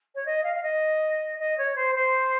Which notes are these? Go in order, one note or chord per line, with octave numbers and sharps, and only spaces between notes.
C#5
D#5
F5
F5
D#5
D#5
C#5
C5
C5